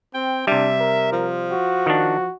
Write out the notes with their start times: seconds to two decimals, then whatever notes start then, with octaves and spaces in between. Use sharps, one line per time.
0.14 C4 G5
0.47 C3 G3 D4 E5
0.80 A#4
1.12 F3
1.51 F#4
1.86 D#3 D4